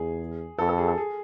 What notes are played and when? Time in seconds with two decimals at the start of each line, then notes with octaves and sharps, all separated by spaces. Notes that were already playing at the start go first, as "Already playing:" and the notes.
Already playing: E2 G#4
0.58 F2 A4
0.69 A4
0.78 G#4
0.88 A4
0.98 G#4